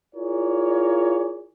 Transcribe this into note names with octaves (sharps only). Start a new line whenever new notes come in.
E4 F4 G#4 A#4 C#5 D5